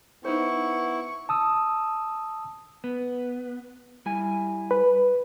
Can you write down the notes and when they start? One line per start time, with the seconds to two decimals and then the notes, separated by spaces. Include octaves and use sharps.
0.25 B3 D#4 E4 C5 C#6
1.29 A5 D#6 E6
2.84 B3
4.06 G3 E4 G#5
4.71 B4